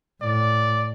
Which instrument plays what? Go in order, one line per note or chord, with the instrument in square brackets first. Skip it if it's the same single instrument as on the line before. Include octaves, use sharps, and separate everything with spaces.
[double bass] A2 [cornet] D5